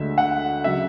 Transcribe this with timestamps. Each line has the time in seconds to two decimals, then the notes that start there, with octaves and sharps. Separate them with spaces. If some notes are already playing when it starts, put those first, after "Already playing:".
Already playing: D2 D3 G#3 E5
0.18 F#5
0.64 C#3 F#3 E5